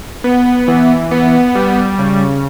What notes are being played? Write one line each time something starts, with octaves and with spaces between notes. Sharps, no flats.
B3
E3
B3
G3
C#3